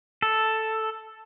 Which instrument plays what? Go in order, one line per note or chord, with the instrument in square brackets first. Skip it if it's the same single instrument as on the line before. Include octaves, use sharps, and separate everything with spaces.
[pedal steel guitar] A4